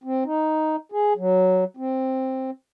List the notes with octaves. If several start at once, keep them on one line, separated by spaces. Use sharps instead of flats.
C4
D#4
G#4
F#3
C4